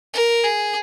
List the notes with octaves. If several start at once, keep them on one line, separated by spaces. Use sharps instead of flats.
A#4
G#4